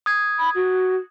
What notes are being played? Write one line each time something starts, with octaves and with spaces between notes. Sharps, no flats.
D#6 G#6
B5
F#4